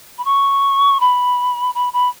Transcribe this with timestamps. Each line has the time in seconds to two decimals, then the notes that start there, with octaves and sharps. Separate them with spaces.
0.18 B5
0.25 C#6
1.00 B5
1.75 B5
1.93 B5